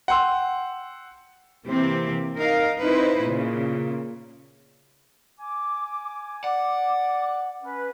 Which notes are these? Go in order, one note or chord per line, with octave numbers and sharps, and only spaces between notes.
F#5 G5 C6 E6
C3 E3 A#3 C4 G4
D#4 A#4 F5
C4 D#4 E4 B4 C5
A#2 C#3
G#5 D6
D5 F#5 D6
C#4 B4